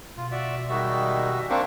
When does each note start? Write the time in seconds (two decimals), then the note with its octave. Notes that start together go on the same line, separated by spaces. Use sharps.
0.17 B2 F4
0.32 F#4 D5 E5
0.69 D#3 G3 G#3 F#4 E5
1.50 A#3 C4 D4 C5 C#6 D6